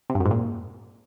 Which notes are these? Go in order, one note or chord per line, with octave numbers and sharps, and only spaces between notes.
C3
G2
F#2
G#2
A#2